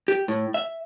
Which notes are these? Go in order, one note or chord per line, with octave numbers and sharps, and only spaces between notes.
G4
A2
E5